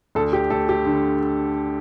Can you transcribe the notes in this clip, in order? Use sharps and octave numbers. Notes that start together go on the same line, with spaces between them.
D2 A4
G4
A3 A4
G4
D3